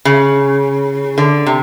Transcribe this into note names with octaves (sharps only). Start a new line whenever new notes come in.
C#3
D3
C3